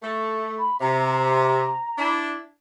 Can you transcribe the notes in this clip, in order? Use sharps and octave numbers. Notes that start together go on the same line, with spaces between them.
A3
B5
C3 A#5
D4 E4